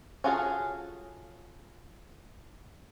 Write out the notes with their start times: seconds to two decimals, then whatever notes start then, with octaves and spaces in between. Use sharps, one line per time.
0.24 C#4 F4 F#4 G#4 A4